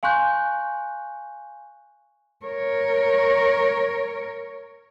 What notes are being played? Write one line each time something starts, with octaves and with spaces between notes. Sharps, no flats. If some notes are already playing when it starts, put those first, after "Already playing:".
F5 G#5 C6 C#6 F#6 G6
A#4 C#5